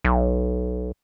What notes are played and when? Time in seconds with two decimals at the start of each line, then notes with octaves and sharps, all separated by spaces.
0.05 B1